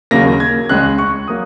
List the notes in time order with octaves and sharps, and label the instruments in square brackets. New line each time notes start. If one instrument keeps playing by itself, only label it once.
[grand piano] D#2 C#3 F#3 A#3 A#6
G#6
C#2 C#3 G#3 F#6
C#6
F#3 A#3 D#6